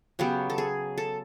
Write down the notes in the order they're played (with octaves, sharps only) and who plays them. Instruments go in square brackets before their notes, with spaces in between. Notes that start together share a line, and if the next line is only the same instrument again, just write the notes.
[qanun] C#3 F#3 B3 G4
A4
G#4
A4